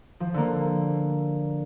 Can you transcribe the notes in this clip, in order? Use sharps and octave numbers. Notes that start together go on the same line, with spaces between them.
F3
D3 A#3